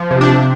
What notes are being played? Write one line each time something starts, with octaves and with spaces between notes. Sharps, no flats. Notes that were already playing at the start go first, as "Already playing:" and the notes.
Already playing: F3
C3
D4